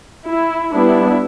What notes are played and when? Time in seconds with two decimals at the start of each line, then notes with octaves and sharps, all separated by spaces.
0.28 E4
0.73 G3 B3 D4 E4